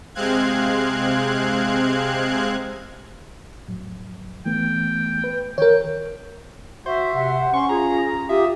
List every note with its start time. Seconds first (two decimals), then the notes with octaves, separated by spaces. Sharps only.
0.15 C3 G#3 C4 F5 F#6 G#6
3.68 F2 A2 F#3
4.46 E3 A3 B3 G5
5.24 B4
5.58 D#3 A#4 C#5 G5
6.86 F#4 C5 E5
7.14 C3 F#5
7.54 C#4 C6 C#6
7.69 F4 G#4 A#5
8.29 F4 G4 E5 D#6